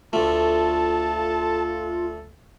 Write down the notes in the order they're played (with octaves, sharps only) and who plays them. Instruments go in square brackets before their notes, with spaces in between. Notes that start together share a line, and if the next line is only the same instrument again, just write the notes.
[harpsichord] D2 A3 [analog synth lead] F4 [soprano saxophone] A4 [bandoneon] A5